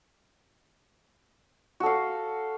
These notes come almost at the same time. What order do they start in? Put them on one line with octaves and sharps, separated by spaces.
F#4 A4 F5